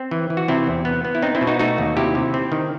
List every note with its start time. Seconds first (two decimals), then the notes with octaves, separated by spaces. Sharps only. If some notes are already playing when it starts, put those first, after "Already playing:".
Already playing: C4
0.11 E3
0.30 E3
0.37 F#4
0.48 C3 C4 E4
0.67 E2
0.85 B3
1.05 B3
1.15 E4
1.22 C4 D#4
1.35 C4 E4
1.41 B2
1.47 D#4 F#4
1.59 A3 D#4 F#4
1.78 D#2
1.97 C3 E4 G4
2.15 C3
2.34 C4
2.52 D#3